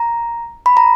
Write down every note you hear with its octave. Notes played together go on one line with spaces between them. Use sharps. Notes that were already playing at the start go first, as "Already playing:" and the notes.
Already playing: A#5
B5
A#5